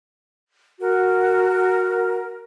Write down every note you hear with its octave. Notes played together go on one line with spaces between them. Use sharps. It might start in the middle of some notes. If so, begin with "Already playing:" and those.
F#4 A#4